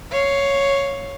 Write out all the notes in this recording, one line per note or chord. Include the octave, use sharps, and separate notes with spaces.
C#5 F5